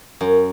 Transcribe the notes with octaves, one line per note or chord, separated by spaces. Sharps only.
F#2